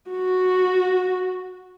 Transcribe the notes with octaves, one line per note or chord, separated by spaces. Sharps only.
F#4